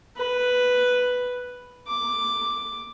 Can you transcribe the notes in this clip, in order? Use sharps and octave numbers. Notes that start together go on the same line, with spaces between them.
B4
D6